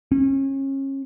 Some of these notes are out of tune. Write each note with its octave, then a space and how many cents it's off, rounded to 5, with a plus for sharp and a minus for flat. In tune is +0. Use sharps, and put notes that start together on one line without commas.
C#4 -30